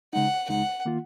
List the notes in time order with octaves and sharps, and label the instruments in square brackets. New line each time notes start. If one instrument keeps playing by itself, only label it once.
[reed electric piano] C#3 G#3 D#4 [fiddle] F#5
[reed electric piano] C#2 C#3 G#3 D#4 [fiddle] F#5
[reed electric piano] D#3 A#3 F4